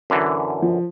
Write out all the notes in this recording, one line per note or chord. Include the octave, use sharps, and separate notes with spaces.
F#2 D3 E3
F3